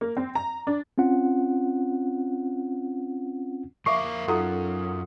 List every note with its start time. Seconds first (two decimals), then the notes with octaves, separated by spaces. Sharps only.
0.01 A#3
0.17 C4
0.35 A#5
0.67 D4
0.98 C4 C#4 F4 F#5
3.86 F2 A#4 E5 F5 C#6 D6 C7
4.28 F#2 D#4 F4 A4 F#5 A#5 D#6